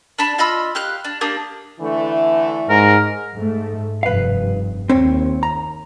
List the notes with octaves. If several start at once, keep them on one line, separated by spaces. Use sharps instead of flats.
D4 A5 B5
F4 D#5 B5 E6
G4 F5 F#6
D4
A#3 D4 G4 D#6
D3 E3 A3
G#2 A#4
G#2 A3
F1 G2 B4 F5
D#2 C4 C5 C#5
A#5